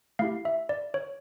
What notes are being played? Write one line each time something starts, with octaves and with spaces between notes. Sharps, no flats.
A3 E4 G4 F5
E5
D5
C#5